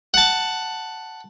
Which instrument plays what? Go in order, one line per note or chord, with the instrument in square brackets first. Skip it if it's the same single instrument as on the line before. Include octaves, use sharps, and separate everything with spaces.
[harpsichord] F#5 A5